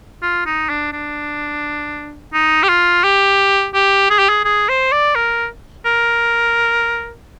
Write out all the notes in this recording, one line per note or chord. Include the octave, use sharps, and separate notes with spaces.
F4
D#4
D4
D4
D#4
G4
F4
G4
G4
G#4
G4
G#4
G#4
C5
D5
A#4
A#4